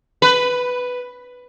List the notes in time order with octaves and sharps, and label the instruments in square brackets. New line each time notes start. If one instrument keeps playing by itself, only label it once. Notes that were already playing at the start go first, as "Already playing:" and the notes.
[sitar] B4